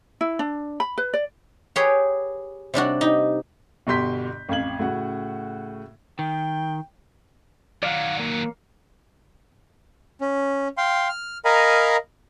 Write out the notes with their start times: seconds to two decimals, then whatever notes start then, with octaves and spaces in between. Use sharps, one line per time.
0.21 E4
0.39 D4
0.80 B5
0.98 B4
1.14 D5
1.76 G4 G#4 B4 C#5 G5
2.74 C3 G3 D4 F#4
3.01 D#4 G4
3.87 G1 B2 G4 C6 G6 B6
4.49 A1 F2 F5 G#6 F#7
4.79 A2 C#3 F#4
6.19 D#3 G5
7.83 D#3 F#3 D5 F5 F#5
8.19 A#3
10.21 C#4
10.77 F5 G5 C6
11.09 F6
11.45 A#4 D#5 F5 G#5 A#5 B5